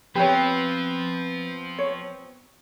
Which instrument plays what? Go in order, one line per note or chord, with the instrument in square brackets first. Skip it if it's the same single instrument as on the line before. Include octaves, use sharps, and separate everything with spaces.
[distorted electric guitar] F3 [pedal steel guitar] B3 C4 B4 [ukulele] G4 C#5
[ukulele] C#5